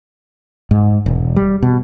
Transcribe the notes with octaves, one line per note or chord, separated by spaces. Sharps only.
G#2
E1
G3
B2